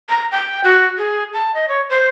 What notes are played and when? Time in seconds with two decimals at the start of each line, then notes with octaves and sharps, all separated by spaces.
0.09 A#5
0.32 G5
0.64 F#4
0.98 G#4
1.33 A5
1.54 D#5
1.68 C#5
1.90 C5